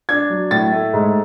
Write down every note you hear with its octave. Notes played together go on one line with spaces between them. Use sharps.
D4 G#6
F#3
A2 A6
A3
G#2